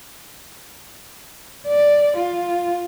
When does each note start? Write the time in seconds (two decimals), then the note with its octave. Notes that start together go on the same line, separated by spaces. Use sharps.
1.67 D5
2.17 F4